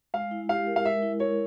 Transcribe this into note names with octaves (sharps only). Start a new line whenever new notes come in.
G#3 F5
E4
G4 F5
A#4
F5
G#3 E5
E4
A#4 C#5